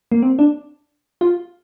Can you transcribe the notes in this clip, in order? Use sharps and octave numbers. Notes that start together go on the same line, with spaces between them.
A#3
C4
D4
F4